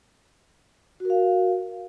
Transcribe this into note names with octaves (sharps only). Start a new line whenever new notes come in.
F#4 A#4 F5